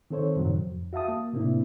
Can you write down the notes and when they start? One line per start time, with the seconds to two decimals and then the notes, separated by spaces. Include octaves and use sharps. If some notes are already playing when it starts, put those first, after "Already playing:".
0.10 D#3 C4 A4 C5 C#5
0.36 F#2 A2 C3 D#3 F#3
0.58 F2
0.93 F#4 E5 F5 A5 D#6
1.08 A#3
1.33 A2 C3 A#3 C4 D4 E4